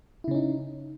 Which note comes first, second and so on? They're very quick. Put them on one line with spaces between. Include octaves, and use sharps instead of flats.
E4 C#3 C#4 D#4